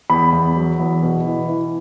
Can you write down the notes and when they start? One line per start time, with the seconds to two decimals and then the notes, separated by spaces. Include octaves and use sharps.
0.10 E2 B5
0.33 E2
0.56 F#3
0.80 E2
1.03 B2
1.26 E3
1.49 E3